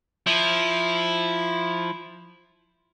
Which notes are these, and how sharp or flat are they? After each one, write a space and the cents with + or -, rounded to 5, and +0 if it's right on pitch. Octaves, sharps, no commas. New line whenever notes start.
F3 +0 E4 +0